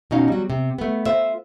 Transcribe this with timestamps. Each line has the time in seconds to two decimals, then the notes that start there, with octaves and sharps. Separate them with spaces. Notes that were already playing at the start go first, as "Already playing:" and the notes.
0.11 B2 C#4 D#4 F5
0.28 F#3 G3
0.50 C3
0.78 A3 B3
1.06 F4 C5 E5